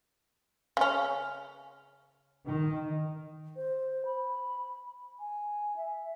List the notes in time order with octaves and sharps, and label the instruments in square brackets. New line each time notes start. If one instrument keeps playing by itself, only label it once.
[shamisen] C#3 C#4
[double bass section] D#3
[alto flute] C5
B5
G#5
E5